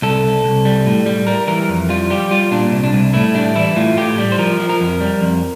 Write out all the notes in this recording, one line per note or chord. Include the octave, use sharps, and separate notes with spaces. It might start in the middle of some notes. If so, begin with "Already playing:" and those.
C2 A4
C2
C2
G3
A2
G3
G3 A#4
E3 A#4
F2
G3 F4
G3 G4
G3 F4
A#2 D4
C2
D4
C2
A2 E4
G3 D4
E3 E4
A2 F4
A2 G4
G3
C5
F3 A#4
F3
A#4
F2
G3
F2